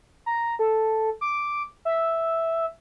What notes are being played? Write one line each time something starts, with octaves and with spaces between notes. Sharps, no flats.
A#5
A4
D6
E5